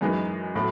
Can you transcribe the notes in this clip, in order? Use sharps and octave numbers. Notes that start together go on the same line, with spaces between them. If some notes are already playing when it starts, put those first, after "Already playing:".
F#2 E3 G#3 D#4
A2 F#3 A3